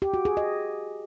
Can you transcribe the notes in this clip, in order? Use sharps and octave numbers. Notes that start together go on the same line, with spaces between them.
G4
F#4
G#4
D#5